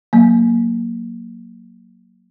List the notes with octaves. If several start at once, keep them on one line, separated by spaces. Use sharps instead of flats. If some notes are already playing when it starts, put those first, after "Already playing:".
F#3 A#3